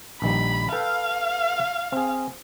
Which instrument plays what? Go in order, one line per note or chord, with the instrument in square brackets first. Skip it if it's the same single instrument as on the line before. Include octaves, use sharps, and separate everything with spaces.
[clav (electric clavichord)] A#1 D#3 G3 [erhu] B5
[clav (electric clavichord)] A4 B4 G5 [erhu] F5
[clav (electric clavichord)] C4 G#4